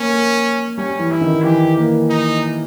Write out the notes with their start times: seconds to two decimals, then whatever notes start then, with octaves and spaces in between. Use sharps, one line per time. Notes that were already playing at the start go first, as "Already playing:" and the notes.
Already playing: A#3 C#4
0.12 A#3
0.78 G3 C#4
0.99 E3
1.11 E4
1.21 D#3
1.44 E3 G4
1.77 A#3
2.10 D#4